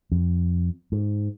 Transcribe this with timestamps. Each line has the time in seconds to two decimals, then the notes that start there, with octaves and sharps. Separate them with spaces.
0.12 F2
0.92 G#2